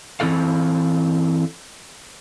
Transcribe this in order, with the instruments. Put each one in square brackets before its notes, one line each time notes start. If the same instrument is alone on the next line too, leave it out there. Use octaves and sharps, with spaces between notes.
[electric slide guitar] E3 C4 E4 A4 F5